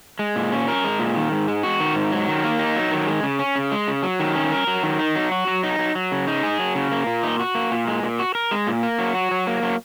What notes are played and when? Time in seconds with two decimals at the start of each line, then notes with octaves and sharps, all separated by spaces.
0.19 G#3
0.36 A#2
0.52 C#4
0.68 A#4
0.84 G#3
0.99 A#2
1.15 D#3
1.32 G#2
1.48 G#3
1.63 F#4
1.80 D#3
1.95 G#2
2.12 F#3
2.28 D#3
2.44 A#3
2.59 D#4
2.76 F#3
2.91 D#3
3.07 G#3
3.23 C#3
3.39 C#4
3.56 C#3
3.72 G#3
3.87 C#3
4.03 F#3
4.20 D#3
4.36 C#4
4.52 A#4
4.67 F#3
4.83 D#3
4.99 D#4
5.15 F#3
5.32 F#4
5.47 F#3
5.63 D#4
5.79 F#3
5.95 F#3
6.12 C#3
6.27 D#4
6.43 G#4
6.59 F#3
6.75 C#3
6.91 A#3
7.07 A#2
7.23 D#4
7.39 F#4
7.55 A#3
7.71 A#2
7.88 G#3
8.03 A#2
8.19 F#4
8.35 A#4
8.51 G#3
8.67 A#2
8.83 A#3
8.99 F#3
9.15 F#4
9.31 F#3
9.47 A#3
9.63 F#3